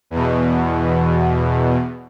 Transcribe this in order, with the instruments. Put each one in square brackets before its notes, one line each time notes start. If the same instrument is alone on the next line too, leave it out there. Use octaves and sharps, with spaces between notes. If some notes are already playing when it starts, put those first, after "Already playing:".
[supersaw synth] E2 B2